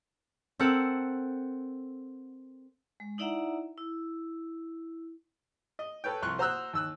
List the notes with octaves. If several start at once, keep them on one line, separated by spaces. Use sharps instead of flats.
C4 A4 A#4 F#5
G#3
D#4 E4 D5 E5 F#5 A#5
E4
D#5
A4 B4 C#5 G5
C2 F3 C6 C#6 F6 F#6
F#4 C5 A#5 D#6 E6 F#6
D#2 E6 F#6